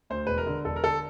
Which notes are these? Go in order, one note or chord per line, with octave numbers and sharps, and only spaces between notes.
D2 C5
E1 B4
A#4
D3
E1 A4
A#4
D3 A4